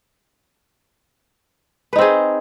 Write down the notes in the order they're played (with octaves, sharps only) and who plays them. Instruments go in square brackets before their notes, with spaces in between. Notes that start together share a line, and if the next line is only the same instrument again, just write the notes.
[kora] B4
D#4
C4
G#4